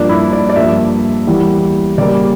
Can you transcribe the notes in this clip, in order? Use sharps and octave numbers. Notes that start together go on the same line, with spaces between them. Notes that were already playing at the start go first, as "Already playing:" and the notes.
Already playing: G2 F3 A#3 D4
E4
D5
D5
G2 F3 A#3 E5
E2 E3 G3 A#3
C#3 G3 A#3 D5